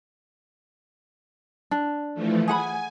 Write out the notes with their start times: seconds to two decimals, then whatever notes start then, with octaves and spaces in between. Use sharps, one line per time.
1.71 D4
2.14 E3 F3 A3
2.48 G#4 F#5 G#5 B5